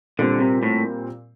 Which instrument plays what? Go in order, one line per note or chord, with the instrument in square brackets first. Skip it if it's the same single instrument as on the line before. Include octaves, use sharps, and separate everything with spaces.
[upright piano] A#2 G3 C4 [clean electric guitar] D3
[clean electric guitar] C3
A2